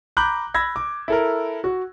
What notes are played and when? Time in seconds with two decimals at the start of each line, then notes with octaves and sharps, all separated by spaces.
0.17 A#5 B5 D6 F#6 G6 F#7
0.54 B5 E6 G#6 A#6
0.76 D6
1.08 E4 A4 A#4
1.64 F#4